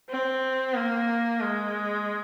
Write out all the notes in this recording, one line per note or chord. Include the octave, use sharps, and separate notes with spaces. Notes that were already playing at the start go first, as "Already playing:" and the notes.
C4
A#3
G#3